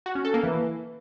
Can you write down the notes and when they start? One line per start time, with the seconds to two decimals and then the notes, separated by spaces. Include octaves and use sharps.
0.06 F#4
0.15 C#4
0.25 A4
0.34 A#3
0.43 E3